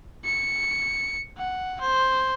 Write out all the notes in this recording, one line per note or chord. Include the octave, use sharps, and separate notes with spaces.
C#7
F#5
C5